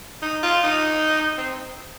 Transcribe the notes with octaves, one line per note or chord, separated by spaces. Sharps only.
D#4
F4
D#4
C4